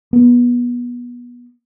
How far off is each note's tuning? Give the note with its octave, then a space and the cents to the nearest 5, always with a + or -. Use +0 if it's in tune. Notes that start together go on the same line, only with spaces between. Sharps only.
B3 -25